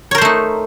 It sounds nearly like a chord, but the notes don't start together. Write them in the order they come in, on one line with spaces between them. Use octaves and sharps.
C#5 A#4 C5 A3 D#4